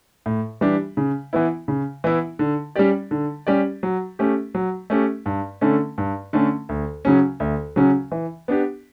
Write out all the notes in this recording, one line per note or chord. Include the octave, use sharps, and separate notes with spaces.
A2
E3 G3 D4 G4
C#3
E3 B3 E4
C#3
E3 B3 E4
D3
G3 C#4 G4 D5
D3
G3 C#4 G4 D5
F#3
A3 C#4 G4
F#3
A3 C#4 G4
G2
D3 A3 C#4
G2
D3 A3 C#4
D2
C#3 F#3 C#4
D2
C#3 F#3 C#4
E3
B3 D4 G4